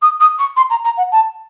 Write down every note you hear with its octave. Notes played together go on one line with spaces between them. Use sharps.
D#6
D#6
C#6
C6
A#5
A#5
F#5
A5